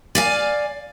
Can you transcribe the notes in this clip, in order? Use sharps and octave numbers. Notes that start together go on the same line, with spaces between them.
D5 F5 G#5